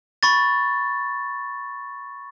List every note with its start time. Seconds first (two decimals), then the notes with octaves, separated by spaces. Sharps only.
0.23 B5 C#6 A6